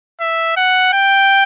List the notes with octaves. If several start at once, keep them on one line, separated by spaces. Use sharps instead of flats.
E5
F#5
G5